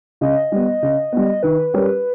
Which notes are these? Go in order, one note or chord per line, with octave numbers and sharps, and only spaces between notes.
C#3 D#5
G3 B3
C#3
G3 B3
D#3 B4
G3 C#4 G4 A#4